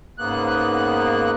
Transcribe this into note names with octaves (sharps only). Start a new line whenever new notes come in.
G#2 C#3 A#3 B3 F#6